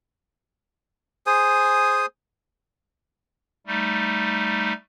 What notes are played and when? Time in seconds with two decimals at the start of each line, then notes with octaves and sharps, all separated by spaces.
1.27 G#4 C5 G#5 D#6
3.67 G3 A3 D#4